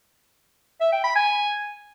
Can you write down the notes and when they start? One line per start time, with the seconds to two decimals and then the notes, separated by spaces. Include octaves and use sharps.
0.81 E5
0.92 G5
1.04 B5
1.16 G#5